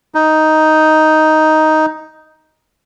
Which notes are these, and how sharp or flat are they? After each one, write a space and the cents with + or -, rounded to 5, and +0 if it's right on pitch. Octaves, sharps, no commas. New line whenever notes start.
D#4 +5